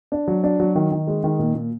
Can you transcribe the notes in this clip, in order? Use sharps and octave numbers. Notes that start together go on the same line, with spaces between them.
D4
F#3
D4
F#3
D#3
D#3
G#3
D#3
A#2
A#2